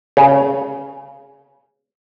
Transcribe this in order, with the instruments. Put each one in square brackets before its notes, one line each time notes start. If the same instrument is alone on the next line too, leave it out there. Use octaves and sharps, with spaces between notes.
[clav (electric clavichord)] C#3